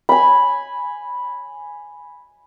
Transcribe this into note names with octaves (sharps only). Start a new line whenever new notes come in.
G#5 B5